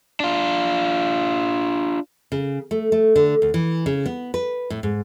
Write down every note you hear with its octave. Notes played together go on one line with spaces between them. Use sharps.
D4 F4
C#3
A3
A3
D3
D2
E3
C#3
B3
B4
A2
G#2